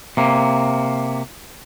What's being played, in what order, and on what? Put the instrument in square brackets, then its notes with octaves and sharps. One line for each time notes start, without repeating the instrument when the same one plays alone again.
[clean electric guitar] C3 A#3